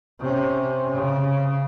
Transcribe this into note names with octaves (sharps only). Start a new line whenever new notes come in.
C3 C#4
C#3